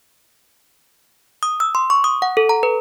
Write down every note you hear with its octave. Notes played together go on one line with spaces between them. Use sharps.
D#6
E6
C6
C#6
D#6
F#5
A4
A#5
B4